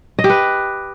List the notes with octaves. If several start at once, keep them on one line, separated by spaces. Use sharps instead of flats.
D#5
G4
B4